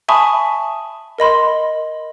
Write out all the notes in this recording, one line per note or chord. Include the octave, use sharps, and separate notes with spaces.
E5 G#5 A5 B5 C#6 D#6
A#4 D#5 B5 C6